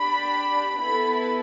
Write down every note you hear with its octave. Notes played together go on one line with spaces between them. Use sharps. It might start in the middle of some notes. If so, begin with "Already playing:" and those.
Already playing: D4 G4 B5
B3 E4 A4 B5